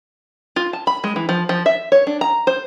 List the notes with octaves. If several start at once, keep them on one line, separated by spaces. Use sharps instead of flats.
F4
A5
B5
G#3
E3
F3
F3
E5
C#5
D4
A#5
C5